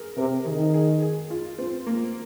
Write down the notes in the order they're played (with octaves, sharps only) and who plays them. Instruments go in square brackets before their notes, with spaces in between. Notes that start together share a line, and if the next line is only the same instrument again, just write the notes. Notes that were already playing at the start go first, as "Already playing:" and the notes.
Already playing: [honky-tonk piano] G#4 A#4
[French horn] C3 [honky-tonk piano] A#4
[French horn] D#3 [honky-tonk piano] G#4
[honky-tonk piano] G#4
G#4
F4
C4
A#3